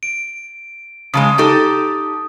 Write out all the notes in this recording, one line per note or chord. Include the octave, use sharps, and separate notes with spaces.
D7
C#3 G3 G#3 A5 D#6
D#4 G4 A4